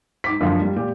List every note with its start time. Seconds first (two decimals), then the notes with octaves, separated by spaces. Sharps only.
0.24 G#2 D6 B6
0.41 F#2 D3 F3
0.61 G3
0.76 A#2 G4